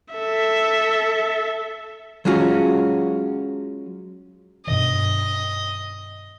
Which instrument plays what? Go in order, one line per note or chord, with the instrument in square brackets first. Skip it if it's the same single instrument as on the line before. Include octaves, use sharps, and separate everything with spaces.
[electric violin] A4 E5
[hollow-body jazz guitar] F#3 G#3 C#4 F4 F#4
[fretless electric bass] G2 B2 D#3 [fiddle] D#5